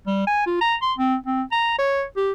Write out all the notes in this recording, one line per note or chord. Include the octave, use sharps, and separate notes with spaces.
G3
G#5
F4
A#5
C6
C4
C4
A#5
C#5
G4